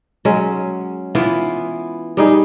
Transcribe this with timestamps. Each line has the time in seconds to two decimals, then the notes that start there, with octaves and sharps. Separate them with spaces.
0.25 F#3 G#3 C#4
1.15 E3 B3 E4 F4
2.17 G3 D#4 G#4